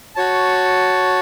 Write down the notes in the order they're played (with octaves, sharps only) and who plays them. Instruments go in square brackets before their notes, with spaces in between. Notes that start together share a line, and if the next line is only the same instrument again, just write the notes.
[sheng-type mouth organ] F#4 C#5 A5